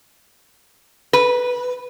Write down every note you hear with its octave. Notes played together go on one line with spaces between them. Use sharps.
B4